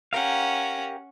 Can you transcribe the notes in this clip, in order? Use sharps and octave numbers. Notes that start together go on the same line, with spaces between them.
C#4 G4 A#4 F5 F#5